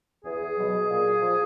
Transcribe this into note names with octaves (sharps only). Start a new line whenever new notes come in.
E2 G#4
B2 F#3
A#2
F3